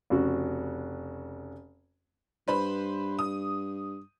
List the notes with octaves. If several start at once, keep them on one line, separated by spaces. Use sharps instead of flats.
F1 C#3 F#4
G2 B4 C5 B5
D#6